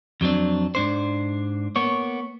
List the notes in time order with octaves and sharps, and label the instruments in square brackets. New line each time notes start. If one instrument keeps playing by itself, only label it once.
[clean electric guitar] F2 F#3 C4 D4
G#2 D4 C5
A#3 B3 C#5